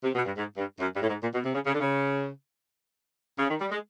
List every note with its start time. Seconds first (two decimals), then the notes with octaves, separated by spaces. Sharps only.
0.04 C3
0.15 B2
0.25 G2
0.37 G#2
0.57 G2
0.80 F#2
0.94 G2
1.02 A2
1.08 G#2
1.23 A#2
1.34 B2
1.45 C3
1.55 C#3
1.66 C#3
1.73 D3
1.80 C#3
3.39 C#3
3.50 D#3
3.61 G3
3.71 G#3